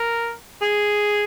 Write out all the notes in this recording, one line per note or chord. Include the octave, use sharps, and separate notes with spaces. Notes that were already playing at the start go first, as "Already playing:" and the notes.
Already playing: A#4
G#4